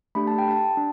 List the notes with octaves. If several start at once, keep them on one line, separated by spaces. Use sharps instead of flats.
A3 D4 G4 B5
A5
G5
A5
D4